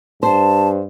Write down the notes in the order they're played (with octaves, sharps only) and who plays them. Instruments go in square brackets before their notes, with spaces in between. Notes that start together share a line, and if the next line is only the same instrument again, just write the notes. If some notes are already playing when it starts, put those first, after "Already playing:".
[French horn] G2 [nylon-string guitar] C5 [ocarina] A5